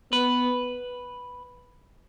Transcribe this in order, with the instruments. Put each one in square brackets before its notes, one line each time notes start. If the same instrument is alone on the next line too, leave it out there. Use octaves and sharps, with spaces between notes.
[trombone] B3 [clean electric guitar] B4